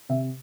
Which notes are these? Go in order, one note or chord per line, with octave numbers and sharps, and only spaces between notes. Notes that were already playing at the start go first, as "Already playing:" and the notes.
C3 E5